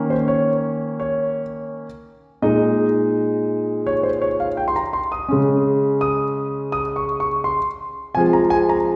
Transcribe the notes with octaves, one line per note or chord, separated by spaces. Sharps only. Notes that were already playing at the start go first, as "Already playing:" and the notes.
Already playing: D#3 A#3 C#4
C5
C#5
C#5
A#2 G#3 D#4 D#5
C#5
C5
C#5
F5
G5
C6
A#5
C6
D#6
C#3 G#3 C#4
D#6
D#6
C#6
C#6
C6
C3 F3 G#3 G#5
A#5
G#5
A#5